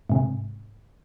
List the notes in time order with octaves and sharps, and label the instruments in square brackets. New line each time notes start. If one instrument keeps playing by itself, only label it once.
[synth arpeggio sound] G#2 C3